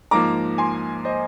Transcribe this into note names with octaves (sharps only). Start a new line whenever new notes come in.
G#2 F3 A#3 A#5 D6
G#5 C6
C5 D#5